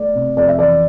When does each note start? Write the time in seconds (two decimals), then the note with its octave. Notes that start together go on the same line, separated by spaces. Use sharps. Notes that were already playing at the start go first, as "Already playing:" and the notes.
Already playing: A3 D5
0.15 C3
0.37 F2 D5
0.48 E5
0.59 E3 D5